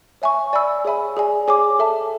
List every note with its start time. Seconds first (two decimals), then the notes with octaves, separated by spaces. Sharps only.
0.22 C#5 E5 G#5 C#6
0.53 D5 G#5 B5 E6
0.85 G#4 C#5 E5 G#5 B5
1.17 G#4 D5 G#5
1.48 G#4 C#5 G#5 D6
1.79 A4 E5 A5